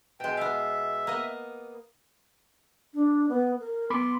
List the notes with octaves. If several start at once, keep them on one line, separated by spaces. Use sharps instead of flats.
B2 G#3 G5
B3 E5 F5
A#3 B3 D#5
D4
B3
A#4
B3 B5 C6 D6